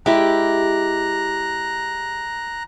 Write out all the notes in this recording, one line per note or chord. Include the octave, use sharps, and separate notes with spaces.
G#3 E4 G4 A#5 F#6